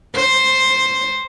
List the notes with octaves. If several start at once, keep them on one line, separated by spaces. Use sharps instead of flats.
C5